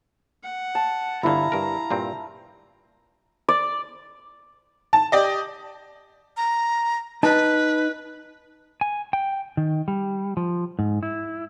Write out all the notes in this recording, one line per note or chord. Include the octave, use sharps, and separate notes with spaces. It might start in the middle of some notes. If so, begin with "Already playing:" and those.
F#5
A5
G1 D3 E4 F5 A#5
G2 A#4
G2 A#2 C4
D5
A5
G4 D5 D#5
A#5
D#4 B4 D#5 A5
G#5
G5
D#3
G3
F3
G#2
E4